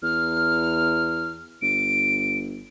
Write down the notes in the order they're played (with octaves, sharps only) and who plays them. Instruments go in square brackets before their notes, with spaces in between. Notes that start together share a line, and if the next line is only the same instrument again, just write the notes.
[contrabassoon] E2 [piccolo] F6
[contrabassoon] G1 [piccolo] D7